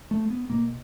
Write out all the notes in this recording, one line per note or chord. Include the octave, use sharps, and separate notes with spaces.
A3
B3
B2 A#3